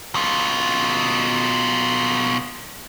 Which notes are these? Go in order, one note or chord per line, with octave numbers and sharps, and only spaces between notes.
B2 F4